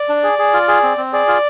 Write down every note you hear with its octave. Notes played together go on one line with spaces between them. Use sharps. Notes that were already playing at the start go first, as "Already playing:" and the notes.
Already playing: D5
D4
G#4
G#4
F4
G#4
C4
C4
G#4 D5
F4